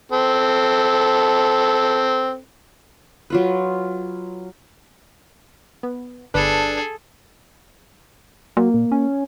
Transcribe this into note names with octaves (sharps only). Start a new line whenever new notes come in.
C4 A4
F#3 F4 B4
B3
G1 D4 G#4 A4 B4
F#3 A#3
A#2
C#4